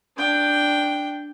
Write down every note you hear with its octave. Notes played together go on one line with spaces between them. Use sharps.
D4 G5